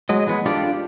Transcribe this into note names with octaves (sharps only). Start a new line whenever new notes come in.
F#3 G#3 D#5
E3 G#3 B3
D4 F4 G4 A4 D5